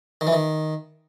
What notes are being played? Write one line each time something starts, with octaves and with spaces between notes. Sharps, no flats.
D#3
E3
D#3